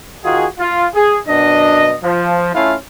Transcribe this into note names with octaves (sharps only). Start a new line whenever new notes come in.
D#3 F4 F#4 G#4
F4
G#4
F#2 B2 D4 D#5
F3
A3 C#4 E4 F4 F5